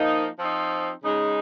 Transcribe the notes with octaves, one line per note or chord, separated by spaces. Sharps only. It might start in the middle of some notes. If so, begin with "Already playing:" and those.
Already playing: F3 A#3 D#4
F3 C4 D#4
C#3 G#3 D#4